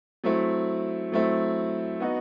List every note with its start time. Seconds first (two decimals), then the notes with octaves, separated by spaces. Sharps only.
0.24 F#3 A3 C4 E4
1.12 F#3 A3 C4 E4
2.00 B3 D#4 F#4